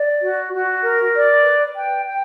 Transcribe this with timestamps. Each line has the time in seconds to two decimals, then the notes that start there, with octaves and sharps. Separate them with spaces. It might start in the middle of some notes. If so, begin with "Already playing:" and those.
Already playing: D5
0.21 F#4
0.53 F#4
0.82 A#4
1.13 D5
1.44 B4
1.74 G5
2.05 G5